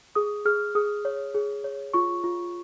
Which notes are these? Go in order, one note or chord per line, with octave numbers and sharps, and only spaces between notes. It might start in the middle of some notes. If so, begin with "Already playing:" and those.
G#4 D#6
G#4 F6
G#4 D#6
C#5
G#4
C#5
F4 C#6
F4